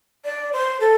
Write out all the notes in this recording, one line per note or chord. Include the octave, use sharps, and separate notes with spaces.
D5
C5
A4